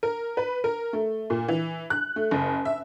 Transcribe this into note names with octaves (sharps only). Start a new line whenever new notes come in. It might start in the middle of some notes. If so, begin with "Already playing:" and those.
A#4
B4
A#4
A3
A#2
E3
F#6
A3
F#1
E5